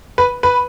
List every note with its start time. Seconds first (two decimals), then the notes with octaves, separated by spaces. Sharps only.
0.18 B4
0.43 B4